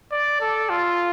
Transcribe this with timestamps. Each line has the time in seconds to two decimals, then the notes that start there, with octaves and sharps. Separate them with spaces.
0.12 D5
0.41 A4
0.69 F4